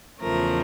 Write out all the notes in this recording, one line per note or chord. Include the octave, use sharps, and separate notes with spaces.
E2 C#3 F3 A3 A#4